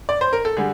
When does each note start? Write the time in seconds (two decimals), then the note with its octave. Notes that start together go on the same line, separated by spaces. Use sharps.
0.09 D5
0.21 C5
0.33 A#4
0.45 A4
0.57 D3 G3 G#4